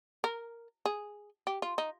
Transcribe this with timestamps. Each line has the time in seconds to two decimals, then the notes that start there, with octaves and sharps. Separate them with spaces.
0.24 A#4
0.85 G#4
1.47 G4
1.62 F4
1.78 D#4